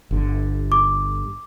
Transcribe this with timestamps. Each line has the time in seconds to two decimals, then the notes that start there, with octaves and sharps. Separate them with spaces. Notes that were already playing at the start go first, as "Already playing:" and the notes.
0.11 G1 D3
0.72 D6